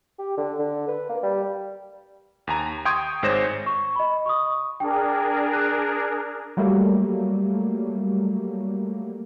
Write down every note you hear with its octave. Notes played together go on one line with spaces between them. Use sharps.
G4
D3
D3
B4
A#3
G3
D#2 G#5 A#5
G5 C6 C#6 D#6 G6 G#6
G#1 G#2 C5 C#5 A#6 E7
C#6
D#5 B5
C#6 D#6
D4 G#4 A#4 G5
F#6
F#3 G3 A3 A#3